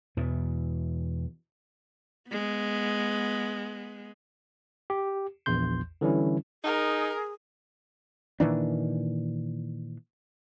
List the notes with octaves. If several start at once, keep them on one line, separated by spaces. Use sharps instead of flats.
E2 B2 E3
G#3 B3
G4
A#1 E2 C6 G6
D3 E3 G3 C#4 E4
D#4 G#4 A#4
A#2 D#3 E3 D4